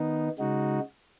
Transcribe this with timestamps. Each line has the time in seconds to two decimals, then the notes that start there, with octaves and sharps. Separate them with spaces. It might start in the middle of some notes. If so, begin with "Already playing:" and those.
Already playing: D#3 B3 D#4
0.39 C#3 G#3 D#4 F#4